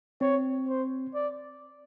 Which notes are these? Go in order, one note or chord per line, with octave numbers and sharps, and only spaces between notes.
C4 C#5
C5
D5